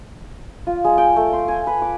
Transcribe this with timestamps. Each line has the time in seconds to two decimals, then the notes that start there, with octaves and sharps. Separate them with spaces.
0.67 F4
0.84 G#3
0.98 G5
1.16 A3
1.33 C6
1.48 G#5
1.67 B4
1.82 D6